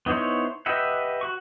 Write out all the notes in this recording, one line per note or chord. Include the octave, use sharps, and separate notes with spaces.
B3 D#4 E4 C5 C#5
G4 B4 D#5 E5 F#5
F#4 C#6